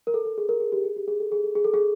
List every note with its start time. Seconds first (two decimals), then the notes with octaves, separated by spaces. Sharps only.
0.07 A#4
0.14 A4
0.25 A4
0.38 G#4
0.49 A#4
0.60 G#4
0.72 G4
0.84 G#4
0.97 G4
1.08 G#4
1.20 A4
1.32 G#4
1.44 A4
1.55 G#4
1.64 A4
1.74 G#4